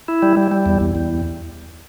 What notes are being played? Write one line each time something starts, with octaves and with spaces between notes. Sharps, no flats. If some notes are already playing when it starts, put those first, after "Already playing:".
E4
G3
G3
G3
E2
E2
E2